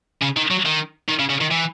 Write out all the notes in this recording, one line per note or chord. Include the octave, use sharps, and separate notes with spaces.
C#3
D#3
F#3
D#3
D#3
C#3
C#3
D#3
E3